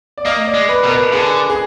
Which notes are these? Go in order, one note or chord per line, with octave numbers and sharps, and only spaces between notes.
D5
A#3 D#5
D5
G#3
B4
B2 A#4
B4
D3 G#4
G#4